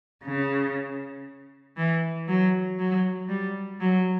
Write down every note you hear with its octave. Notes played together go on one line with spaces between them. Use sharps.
C#3
E3
F#3
F#3
G3
F#3